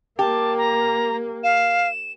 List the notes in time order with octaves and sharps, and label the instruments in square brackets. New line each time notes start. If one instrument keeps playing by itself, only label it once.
[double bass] A#3 [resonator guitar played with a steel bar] G4 [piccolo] A5
[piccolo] A#5
[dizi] F5 [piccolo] E7